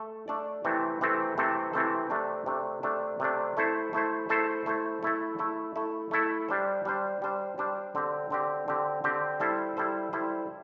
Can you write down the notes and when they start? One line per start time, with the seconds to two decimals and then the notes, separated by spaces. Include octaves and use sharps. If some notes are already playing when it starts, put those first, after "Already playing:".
Already playing: A3 A4
0.28 A3 D4 A4 D5
0.65 C3 E3 A3 C4 A4
1.01 C3 E3 A3 C4 A4
1.38 C3 E3 A3 C4 A4
1.73 C3 E3 A3 C4 A4
2.10 C3 A3 D4
2.46 C3 A3 D4
2.83 C3 A3 D4
3.20 C3 A3 D4
3.57 A3 E4 A4 C5
3.93 A3 E4 A4 C5
4.29 A3 E4 A4 C5
4.66 A3 E4 A4 C5
5.03 A3 E4 A4
5.39 A3 E4 A4
5.76 A3 E4 A4
6.11 A3 E4 A4
6.49 G3 D4 C5
6.85 G3 D4 C5
7.22 G3 D4 C5
7.58 G3 D4 C5
7.95 D3 C4 G4
8.30 D3 C4 G4
8.68 D3 C4 G4
9.04 D3 C4 G4
9.40 G3 E4 A4 C5
9.77 G3 E4 A4 C5
10.13 G3 E4 A4 C5